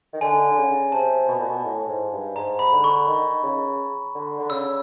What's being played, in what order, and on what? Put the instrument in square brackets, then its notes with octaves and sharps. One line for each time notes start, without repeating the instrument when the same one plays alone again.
[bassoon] D#3
[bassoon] D3 [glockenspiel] G#5
[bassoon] D3
C#3
[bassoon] C3 [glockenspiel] A5
[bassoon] B2
A#2
B2
A2
G#2
G2
[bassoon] G#2 [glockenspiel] A#5
[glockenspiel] B5
[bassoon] D3
[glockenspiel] C#6
[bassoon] D#3
C#3
D3
D3
[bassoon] C#3 [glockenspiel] E6